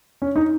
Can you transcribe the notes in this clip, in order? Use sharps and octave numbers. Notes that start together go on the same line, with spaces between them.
C#4
D#4